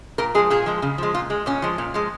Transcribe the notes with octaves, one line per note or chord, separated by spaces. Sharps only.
A#2 A#4
F3 G#3 G#4
A#2 G#4
F3 G#3
C#3
F3 G#3
A#2 F4
G#3
A#2 C#4
F3 G#3
A#2
F3 G#3